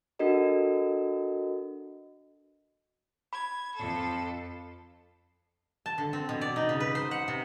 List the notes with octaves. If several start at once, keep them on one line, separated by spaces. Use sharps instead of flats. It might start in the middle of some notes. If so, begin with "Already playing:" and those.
D4 F#4 A4 A#4 D#5 E5
B5 G#6
F2 A4
A5
D3
C4
B2
D5
D#4
C#3
B4
C5
F#5
C3